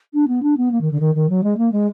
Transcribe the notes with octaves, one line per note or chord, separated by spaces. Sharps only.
D4
B3
D4
B3
A#3
D#3
D3
D#3
D#3
F#3
G#3
A#3
G#3